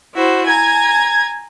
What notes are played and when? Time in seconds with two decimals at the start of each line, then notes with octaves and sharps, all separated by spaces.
0.15 E4 F#4 C5
0.47 G#5 A#5 G#6